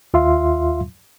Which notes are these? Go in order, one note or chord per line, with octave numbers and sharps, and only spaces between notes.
D#2 F4 E5 F5 C6